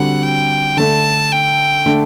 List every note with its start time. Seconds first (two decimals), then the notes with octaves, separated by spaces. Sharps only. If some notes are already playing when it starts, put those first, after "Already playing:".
Already playing: D3 G3 C4 F#4 F#5
0.23 G5
0.77 D3 A3 D4 A5
1.32 G5
1.86 D3 A3 D4